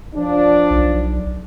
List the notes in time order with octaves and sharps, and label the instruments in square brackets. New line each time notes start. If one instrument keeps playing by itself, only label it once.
[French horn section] F3 D4
[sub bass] B1